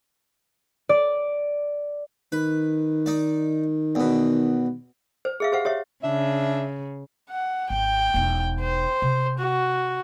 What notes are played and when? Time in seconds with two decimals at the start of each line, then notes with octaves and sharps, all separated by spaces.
0.89 D5
2.32 D#3 B4
3.06 D#4 D5
3.95 E2 B2
5.25 C5
5.40 G#4 E5 F5
5.52 G4 C5 F5 F#5
5.65 G4 C#5 E5
6.04 C#3 D4 E5
7.30 F#5
7.70 G#1 G5
8.14 E1 D#4
8.61 C5
9.02 C3
9.39 F#4